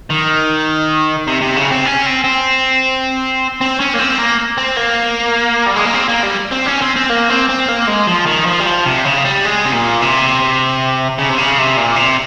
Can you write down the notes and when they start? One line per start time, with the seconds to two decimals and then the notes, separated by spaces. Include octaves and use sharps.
0.10 D#3
1.27 C3
1.41 C3
1.56 C#3
1.70 C4
1.85 C#4
2.06 C4
2.24 C4
3.61 C4
3.80 C#4
3.94 A#3
3.99 C4
4.18 A#3
4.58 C4
4.77 A#3
5.66 G3
5.76 G#3
5.85 A#3
5.94 C4
6.08 A#3
6.23 G3
6.52 C4
6.67 C#4
6.82 C4
6.96 C4
7.10 A#3
7.30 C4
7.49 C4
7.69 A#3
7.88 G#3
8.07 F3
8.26 D#3
8.46 F3
8.60 G3
8.66 F3
8.86 C3
9.05 C#3
9.25 G3
9.44 G#3
9.65 C3
9.73 A#2
10.02 C3
11.18 C#3
11.29 C3
11.38 C#3
11.58 C3
11.77 A#2
11.96 C3